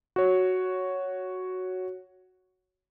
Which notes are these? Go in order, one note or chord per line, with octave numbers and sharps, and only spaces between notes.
F#4 C#5